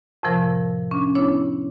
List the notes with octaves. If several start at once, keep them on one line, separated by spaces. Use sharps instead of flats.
F2 A2 C3 F3 A#4
C#4 D4
B3 D4 E4 C#5